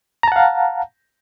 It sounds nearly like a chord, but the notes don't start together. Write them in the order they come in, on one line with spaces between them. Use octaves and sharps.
A#5 A5 F#5 F5